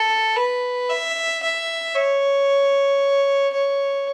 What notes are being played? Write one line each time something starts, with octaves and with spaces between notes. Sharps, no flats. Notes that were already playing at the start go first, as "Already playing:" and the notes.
Already playing: A4
B4
E5
E5
C#5
C#5